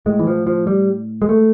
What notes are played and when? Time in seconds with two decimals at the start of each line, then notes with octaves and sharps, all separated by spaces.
0.06 A2 G#3
0.19 E3
0.27 F3
0.47 F3
0.67 G3
1.22 G#3
1.29 A3